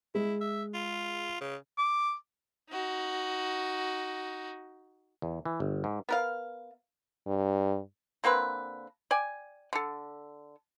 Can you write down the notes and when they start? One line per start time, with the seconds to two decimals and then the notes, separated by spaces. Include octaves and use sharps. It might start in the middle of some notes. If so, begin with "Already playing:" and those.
0.15 G#3 E4
0.41 E5
0.74 F4
1.40 C#3
1.78 D6
2.70 D#4 F#4
5.22 E2
5.45 E3
5.60 G1
5.84 G#2
6.09 B3 A#4 F5
7.27 G2
8.24 D3 A#3 C4 B4
9.11 D5 G5 G#5
9.73 D3 A4